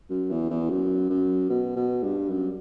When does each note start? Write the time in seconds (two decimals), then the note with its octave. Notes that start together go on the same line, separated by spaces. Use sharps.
0.10 F#2
0.30 E2
0.50 E2
0.70 F#2
1.10 F#2
1.50 B2
1.77 B2
2.04 G2
2.30 F#2